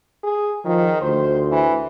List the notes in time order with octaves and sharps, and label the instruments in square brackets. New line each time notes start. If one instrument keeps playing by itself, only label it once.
[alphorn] G#4
[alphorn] D#3 [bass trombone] F3
[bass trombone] D2 [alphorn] C5
[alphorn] E3